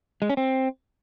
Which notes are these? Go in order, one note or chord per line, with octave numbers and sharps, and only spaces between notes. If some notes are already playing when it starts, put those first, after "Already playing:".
G#3
C#4
C4